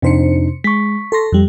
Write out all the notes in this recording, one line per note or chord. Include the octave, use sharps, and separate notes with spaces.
F2 C3 D4 D#4 C5 C#7
G#3 C#6 B6
A4 C6 A#6
F2 G3